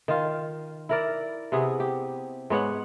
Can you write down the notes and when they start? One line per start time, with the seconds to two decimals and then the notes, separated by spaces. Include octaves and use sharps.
0.08 D#3 F4
0.89 E4 A#4 D5
1.52 C3 B3 G#4
1.80 G4
2.50 G#2 B3 C#5 F#5